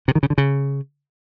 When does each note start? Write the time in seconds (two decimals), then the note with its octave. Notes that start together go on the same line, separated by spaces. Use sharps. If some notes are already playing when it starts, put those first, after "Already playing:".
0.08 C3
0.15 D#3
0.23 C#3
0.30 D3
0.38 C#3